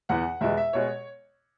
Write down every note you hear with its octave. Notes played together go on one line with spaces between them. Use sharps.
E2 E3 B3 F#5
E2 B2 G#3 E5
E5
B2 G#3 C#5